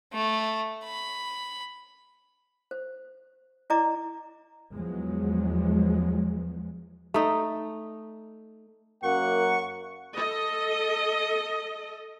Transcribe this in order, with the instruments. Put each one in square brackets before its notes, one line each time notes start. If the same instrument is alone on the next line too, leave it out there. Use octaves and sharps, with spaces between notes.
[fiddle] A3
B5
[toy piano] C5
E4 D5 D#5 A#5 D6
[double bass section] E2 F3 F#3 G#3
[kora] A3 D#4
[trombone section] F#2 A#3 [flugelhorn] F#5 [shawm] C#6
[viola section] A4 D#5